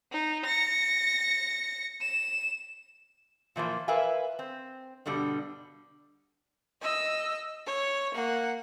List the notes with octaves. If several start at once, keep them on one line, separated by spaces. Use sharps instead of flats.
D#4
A#6 C#7
E7
A#2 E3 F3 A#3
A#4 B4 E5 F5 G#5
C4
G2 B2 D3 G3
D#5 E6
C#5
A#3 F#5